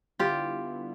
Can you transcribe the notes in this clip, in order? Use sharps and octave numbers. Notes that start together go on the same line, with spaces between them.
D3 G3 B3 E4 F4 G4